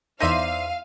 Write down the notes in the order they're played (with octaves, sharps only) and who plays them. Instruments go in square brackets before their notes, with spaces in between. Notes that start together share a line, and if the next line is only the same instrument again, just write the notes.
[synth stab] E2 E5 D#7 [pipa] D#4 C5 D5 [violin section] F5